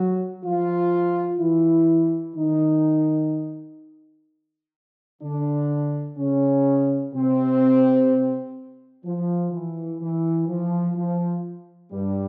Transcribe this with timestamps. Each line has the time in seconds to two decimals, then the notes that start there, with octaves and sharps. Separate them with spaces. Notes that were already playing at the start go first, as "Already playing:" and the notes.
Already playing: F#3 F#4
0.44 F3 F4
1.39 E3 E4
2.35 D#3 D#4
5.22 D3 D4
6.17 C#3 C#4
7.13 C3 C4
9.05 F3
9.52 E3
10.01 E3
10.48 F3
10.96 F3
11.92 G2 G3